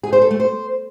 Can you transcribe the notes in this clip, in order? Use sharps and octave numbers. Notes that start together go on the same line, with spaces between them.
G#4
C5
A4
A3
C5